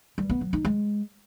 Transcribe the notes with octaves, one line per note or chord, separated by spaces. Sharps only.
G3
B3
F#3
D#4
G#3